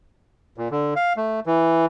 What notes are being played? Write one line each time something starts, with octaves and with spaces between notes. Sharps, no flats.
A#2
D3
F5
A3
E3